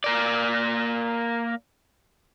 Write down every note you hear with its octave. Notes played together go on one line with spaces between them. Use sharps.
A#3 A#4 D5